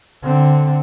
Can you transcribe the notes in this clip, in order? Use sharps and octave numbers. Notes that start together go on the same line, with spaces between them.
D3 C4